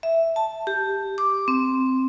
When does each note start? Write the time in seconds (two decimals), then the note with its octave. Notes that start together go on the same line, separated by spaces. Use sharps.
0.03 E5
0.36 A5
0.67 G4
1.18 D6
1.48 C4